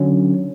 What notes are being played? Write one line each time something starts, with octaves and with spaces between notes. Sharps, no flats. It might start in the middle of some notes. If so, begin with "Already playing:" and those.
Already playing: D3 F#3 C#4